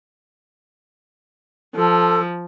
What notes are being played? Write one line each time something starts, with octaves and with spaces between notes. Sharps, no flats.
F3 A4